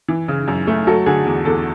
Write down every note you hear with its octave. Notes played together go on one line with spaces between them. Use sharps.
E3
C#3
F#2
A3
F#3 A4
D3 G#4
E2
E2 A4